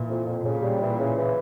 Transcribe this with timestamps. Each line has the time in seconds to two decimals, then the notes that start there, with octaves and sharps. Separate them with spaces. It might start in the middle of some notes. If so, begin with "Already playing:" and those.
Already playing: A#2 E3
0.08 F2
0.26 F2
0.44 A#2 C#3
0.62 G3
0.81 E3
0.98 C#3
1.16 E3